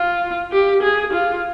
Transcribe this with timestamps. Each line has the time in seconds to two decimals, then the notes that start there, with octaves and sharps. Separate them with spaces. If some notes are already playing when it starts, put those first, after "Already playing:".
Already playing: F4
0.52 G4
0.82 G#4
1.13 F4